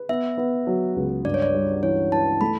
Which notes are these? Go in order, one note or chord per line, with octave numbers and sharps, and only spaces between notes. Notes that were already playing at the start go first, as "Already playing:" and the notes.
Already playing: B4
B3 E5
B3
F#3
C#2
G2 D5
C#5
D5
G3
E3 C#5
E3 A5
A3 B5